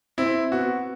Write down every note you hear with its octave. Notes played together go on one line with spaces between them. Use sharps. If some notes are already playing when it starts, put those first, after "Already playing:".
C4 E4
B3 F#4